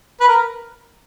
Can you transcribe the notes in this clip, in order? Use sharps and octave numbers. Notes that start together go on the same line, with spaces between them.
B4
A#4